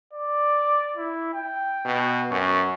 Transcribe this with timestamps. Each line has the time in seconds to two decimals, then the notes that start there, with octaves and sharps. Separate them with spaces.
0.13 D5
0.96 E4
1.34 G5
1.86 B2
2.31 F#2 C#6